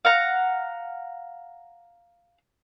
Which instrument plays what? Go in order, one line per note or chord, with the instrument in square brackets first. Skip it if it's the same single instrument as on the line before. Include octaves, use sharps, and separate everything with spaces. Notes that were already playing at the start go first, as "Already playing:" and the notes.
[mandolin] F5 F#5 A#5